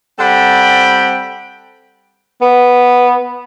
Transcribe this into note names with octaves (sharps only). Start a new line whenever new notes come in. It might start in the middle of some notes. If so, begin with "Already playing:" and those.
G3 C4 A4 F#5 G5 B5
B3